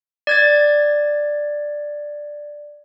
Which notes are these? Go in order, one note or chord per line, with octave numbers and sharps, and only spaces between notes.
D5 G#6 A6